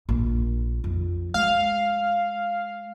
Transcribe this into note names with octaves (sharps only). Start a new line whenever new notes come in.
A#1
F2 D#3
G#3 F5